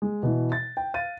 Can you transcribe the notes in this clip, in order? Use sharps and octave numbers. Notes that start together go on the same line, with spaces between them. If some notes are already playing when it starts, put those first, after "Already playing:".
G#3
B2 E3
A6
G5
F5 A6 D#7